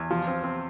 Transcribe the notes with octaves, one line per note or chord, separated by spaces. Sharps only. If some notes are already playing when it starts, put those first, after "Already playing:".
Already playing: E2
F3
C4
C4